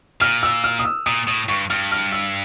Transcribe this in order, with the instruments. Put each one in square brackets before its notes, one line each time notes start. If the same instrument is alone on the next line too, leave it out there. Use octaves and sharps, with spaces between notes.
[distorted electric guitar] A#2 [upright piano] F6
[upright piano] E6
F6
D#6
E6
[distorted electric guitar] A#2 [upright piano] D#6
[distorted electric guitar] A2 [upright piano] D#6
[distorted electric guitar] G2 [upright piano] C#6
[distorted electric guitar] G2 [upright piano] F6
[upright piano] F6
E6